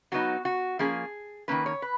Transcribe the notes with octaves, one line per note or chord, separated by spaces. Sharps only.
F#3 B3 D#4 F#4
F#4
F3 A#3 C#4 G#4
D#3 A#3 C#4 B4
C#5
B4